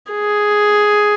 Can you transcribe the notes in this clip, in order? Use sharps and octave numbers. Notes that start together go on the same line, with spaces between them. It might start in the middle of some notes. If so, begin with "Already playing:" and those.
G#4